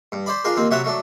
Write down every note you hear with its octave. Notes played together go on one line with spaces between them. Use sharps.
G2
C5 D5 B5
D4 F4 G#4 A#4
D#2 A#3 C4
C3 F#3 C#5 E5 F#5 A5
F#3 A3 D4